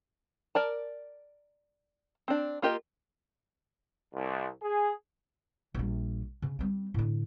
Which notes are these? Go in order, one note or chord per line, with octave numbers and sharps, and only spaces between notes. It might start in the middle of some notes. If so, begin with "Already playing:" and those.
A#4 D5 A5
C4 D4
A#3 F4 G4 A#4 D#5
C2
G#4
A#1 G3
C#3
G3 C4
A2 D3